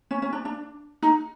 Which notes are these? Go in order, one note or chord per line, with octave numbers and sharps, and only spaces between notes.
C#4
C#4
D4
D4
D#4